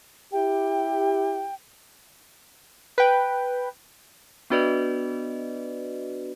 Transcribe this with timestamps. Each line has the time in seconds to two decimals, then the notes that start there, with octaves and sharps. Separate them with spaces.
0.32 E4 G4 G5
2.98 B4 G5
4.50 B3 D4 F#4 B4 D5 D#5